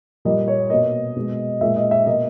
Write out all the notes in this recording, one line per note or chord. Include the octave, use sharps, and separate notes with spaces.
A#2 G3 A#3 D#5
C#5
B2 A#3 D#5
B2 G#3
A#2 G#3 E5
D#5
E5
B2 A#3 D#5